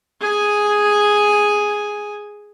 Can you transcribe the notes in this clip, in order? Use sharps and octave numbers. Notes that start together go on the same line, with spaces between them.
G#4 G#5